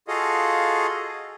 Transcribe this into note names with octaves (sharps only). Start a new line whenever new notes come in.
F4 F#4 G#4 A4 D#5 F5